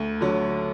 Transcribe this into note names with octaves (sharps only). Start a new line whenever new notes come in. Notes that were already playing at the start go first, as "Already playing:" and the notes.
Already playing: D2
D3 F#3